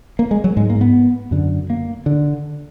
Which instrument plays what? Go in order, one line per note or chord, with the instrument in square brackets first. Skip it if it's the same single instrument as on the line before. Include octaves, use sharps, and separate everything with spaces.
[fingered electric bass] A#3
G#3
F#3
G#2 G#3
A#3
B3
F#2 D3
A#3
D3